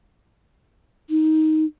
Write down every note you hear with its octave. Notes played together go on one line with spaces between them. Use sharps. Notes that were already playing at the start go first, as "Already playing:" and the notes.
D#4